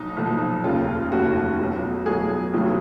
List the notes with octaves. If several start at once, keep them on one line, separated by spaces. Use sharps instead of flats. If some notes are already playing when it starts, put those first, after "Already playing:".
Already playing: B1 A#2 F3 D#4
B1 A#2 F3
F1 D#2 C#3 F4
F1 D#2 C#3 F#4
B1 B2 F#3
B1 B2 F#3 G#4
F1 F2 D#3 F#3